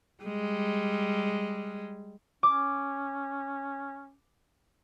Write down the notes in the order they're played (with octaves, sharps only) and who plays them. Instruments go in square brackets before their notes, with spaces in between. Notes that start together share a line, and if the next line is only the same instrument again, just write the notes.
[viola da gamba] G3 G#3
[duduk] C#4 [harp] D6